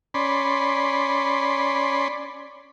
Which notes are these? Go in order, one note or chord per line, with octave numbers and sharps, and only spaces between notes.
C#4 D5 B5 C6